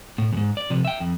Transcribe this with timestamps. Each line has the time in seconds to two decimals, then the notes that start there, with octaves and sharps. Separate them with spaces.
0.18 A2
0.33 E2 G#2
0.57 D5
0.70 C3 F3
0.85 E5 G5
1.00 F2